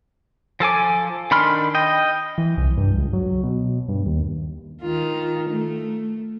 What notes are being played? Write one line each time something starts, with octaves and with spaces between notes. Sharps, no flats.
F3 A4 G#5 D6
D#3 D4 B5 C6 F6
D#5 G5
E3
C2
G2
C#2
F#3
B2
G2
D#2
D#3 F4
A3